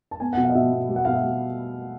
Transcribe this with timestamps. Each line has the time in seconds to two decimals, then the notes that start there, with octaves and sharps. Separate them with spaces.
0.11 A5
0.20 B3 G#5
0.33 F#5
0.37 B2
0.44 F5
0.49 D#5
0.55 B2 E5
0.72 B3
0.89 G3
0.96 F#5
1.05 B2 F5
1.14 E5
1.23 G3